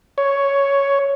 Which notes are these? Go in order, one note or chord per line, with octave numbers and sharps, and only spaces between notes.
C#5